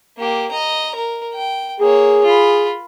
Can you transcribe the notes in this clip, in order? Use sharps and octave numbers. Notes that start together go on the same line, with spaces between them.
A#3 G4
D#5 A#5
A#4
G5
A#3 G#4 C#5
F4 B5